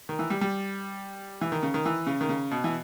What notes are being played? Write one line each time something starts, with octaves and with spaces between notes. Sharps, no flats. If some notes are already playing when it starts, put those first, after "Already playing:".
D#3
E3
G3
G3
E3
D#3
C#3
D#3
E3
C#3
D#3
C#3
B2
E3